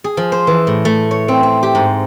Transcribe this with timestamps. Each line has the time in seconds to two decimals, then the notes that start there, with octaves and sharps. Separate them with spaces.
0.04 G#4
0.17 F3
0.32 C5
0.47 E3
0.67 A2
0.85 A3
1.11 C#5
1.28 C4
1.43 C4
1.63 G4
1.75 G#2